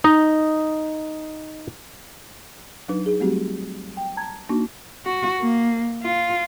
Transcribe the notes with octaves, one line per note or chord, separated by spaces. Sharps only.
D#4 D#5
F#3 D4 D#4 B4
D#4 G#4
F#3 G3 A3 C4 F#4 G4
G5
A5 A#5 G#6
A#3 D4 D#4 F#4
F#4
A#3
F4